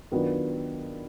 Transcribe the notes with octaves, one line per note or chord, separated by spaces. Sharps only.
D#3 F#3 B3 D4 F4